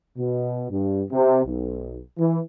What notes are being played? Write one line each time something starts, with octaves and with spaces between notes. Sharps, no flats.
B2
G2
C3
B1
E3